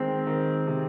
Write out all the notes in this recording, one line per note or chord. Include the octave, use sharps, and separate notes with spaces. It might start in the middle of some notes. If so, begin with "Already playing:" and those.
Already playing: D#3 G#3 C4
D#3
C3